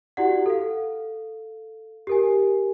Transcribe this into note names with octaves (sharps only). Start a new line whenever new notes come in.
E4 F#4 G4 D5 F#5
A4 F5
G4 A#4 G#5